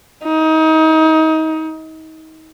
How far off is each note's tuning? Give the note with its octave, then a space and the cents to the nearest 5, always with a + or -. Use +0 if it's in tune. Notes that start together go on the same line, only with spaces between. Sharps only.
D#4 +30